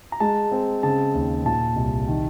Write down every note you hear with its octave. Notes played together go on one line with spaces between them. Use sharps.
A#5
G#3 A5
C4
C#3 A5
D#2
A#2 A5
C2
D#3